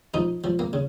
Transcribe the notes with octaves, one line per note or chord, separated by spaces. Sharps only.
F3 D#4
F3
A#3
C#3